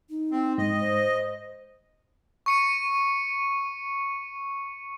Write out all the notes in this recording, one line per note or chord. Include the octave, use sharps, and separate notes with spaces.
D#4
C4
G#2 D#5
C5
C#6 C#7 D#7